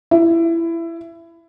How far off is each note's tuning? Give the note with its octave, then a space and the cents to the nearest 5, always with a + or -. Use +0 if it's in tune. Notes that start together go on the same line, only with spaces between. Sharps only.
E4 +15